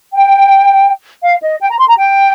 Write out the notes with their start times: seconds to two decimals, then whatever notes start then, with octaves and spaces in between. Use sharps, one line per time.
0.14 G5
1.23 F5
1.42 D#5
1.60 G5
1.70 A#5
1.79 C6
1.87 A#5
1.96 G5